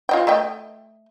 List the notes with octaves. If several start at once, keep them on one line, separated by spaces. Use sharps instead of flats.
F4 D#5 G5
A3 D#5 G5